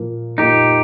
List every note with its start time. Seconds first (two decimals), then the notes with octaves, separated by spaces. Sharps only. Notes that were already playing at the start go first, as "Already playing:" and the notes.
Already playing: A#2 F3 A#3 F4
0.38 A#2 F3 A#3 D#4 F4 G4